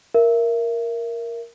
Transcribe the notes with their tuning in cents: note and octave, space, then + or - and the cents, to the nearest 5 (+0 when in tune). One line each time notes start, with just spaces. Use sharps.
A#4 +0 E5 +20